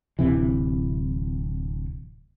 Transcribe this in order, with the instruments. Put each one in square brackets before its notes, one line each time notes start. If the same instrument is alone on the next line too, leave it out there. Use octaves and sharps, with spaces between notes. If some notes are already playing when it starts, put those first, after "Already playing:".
[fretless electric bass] D1 C3 E3